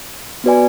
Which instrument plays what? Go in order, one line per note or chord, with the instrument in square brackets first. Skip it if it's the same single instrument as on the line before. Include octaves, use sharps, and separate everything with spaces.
[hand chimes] B3 F#4 B4 D5 G#5